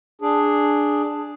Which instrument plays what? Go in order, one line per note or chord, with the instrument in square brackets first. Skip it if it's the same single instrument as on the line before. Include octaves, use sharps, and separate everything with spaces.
[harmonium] D4 G#4